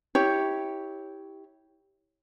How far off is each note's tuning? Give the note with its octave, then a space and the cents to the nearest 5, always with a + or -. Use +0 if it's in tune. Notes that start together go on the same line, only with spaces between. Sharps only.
E4 -25 G4 +0 C#5 +0